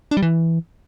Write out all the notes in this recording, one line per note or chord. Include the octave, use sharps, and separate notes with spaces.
D4
G3
E3